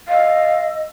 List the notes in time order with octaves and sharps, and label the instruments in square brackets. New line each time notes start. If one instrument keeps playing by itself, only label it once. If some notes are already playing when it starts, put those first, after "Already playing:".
[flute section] D#5 E6 [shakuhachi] F5